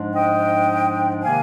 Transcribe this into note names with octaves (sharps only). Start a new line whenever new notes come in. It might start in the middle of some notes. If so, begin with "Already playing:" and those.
Already playing: G#2 F3 G#3 D4
D#5 G5
C3 D#3 A#3 F5 G#5